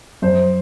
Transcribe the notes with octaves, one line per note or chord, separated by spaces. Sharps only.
F#2 C5